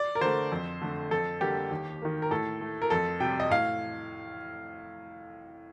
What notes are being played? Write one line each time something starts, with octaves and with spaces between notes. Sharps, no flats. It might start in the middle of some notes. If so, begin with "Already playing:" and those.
Already playing: D5
A#4
D3 A3 C5
F2
D3 A3
F2 A4
D3 G3 A#3 G4
D#2
D#3 A#3
A#4
A2 A4
A3
A#4
F2 A4
C3 G3 G5
D#5
A2 F5